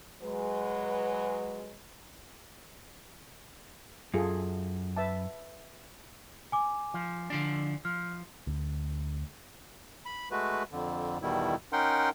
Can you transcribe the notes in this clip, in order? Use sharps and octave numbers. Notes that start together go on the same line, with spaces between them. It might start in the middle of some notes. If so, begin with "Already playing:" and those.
F#3 G#3 B4
F#2 F4 G#4 A4
B4 E5 A5
G#5 D6
F3
D3 F3 D4
F3 F6
D2
B5
G#3 A3 F#4 B4
F2 D3
E2 B2 D#3 G3 E4
C#4 D#4 A#4 F#5 G5 C6